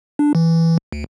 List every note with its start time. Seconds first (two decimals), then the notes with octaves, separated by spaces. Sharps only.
0.19 D4
0.35 E3
0.92 D2